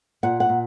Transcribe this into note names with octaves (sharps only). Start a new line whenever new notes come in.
A#2 F#5
F#5
A#2